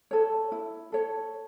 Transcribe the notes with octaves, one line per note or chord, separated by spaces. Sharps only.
A4 C#5
E4
A4 C#5